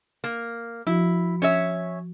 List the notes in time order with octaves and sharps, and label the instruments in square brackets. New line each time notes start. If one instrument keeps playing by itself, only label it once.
[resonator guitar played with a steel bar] A#3
[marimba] F3 F#4 [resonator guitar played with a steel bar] E4
[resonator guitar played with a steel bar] C#4 C#5 E5